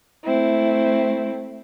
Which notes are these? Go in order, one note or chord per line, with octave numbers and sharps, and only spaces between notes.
A3 C4 E4